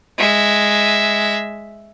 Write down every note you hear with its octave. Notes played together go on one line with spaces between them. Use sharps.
G#3 E5